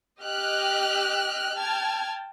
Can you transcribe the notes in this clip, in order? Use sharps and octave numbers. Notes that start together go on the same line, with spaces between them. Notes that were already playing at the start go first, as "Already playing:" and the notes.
G4 D#5 G5 F6 F#6
G5 A5 F6 G#6